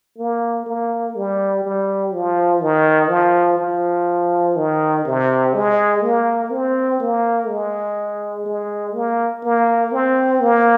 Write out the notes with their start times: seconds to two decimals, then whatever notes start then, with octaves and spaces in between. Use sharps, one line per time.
0.18 A#3
0.66 A#3
1.16 G3
1.64 G3
2.13 F3
2.62 D#3
3.10 F3
3.59 F3
4.56 D#3
5.05 C3
5.54 G#3
6.03 A#3
6.50 C4
7.00 A#3
7.48 G#3
8.46 G#3
8.94 A#3
9.43 A#3
9.92 C4
10.40 A#3